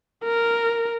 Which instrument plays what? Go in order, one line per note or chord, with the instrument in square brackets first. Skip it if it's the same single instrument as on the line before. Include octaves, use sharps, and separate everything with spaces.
[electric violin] A#4